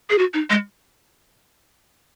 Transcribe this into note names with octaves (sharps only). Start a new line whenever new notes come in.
G#4
F#4
D#4
G#3